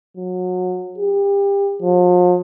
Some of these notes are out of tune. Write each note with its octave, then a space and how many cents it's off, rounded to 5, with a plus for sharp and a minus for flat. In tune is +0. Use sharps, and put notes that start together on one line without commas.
F#3 -25
G4 +30
F3 +40